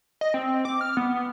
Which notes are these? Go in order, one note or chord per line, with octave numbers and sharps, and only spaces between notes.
D#5
C4
D6
F6
B3
B3